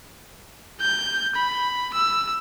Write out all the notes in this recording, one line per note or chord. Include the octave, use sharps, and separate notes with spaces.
G6
B5
E6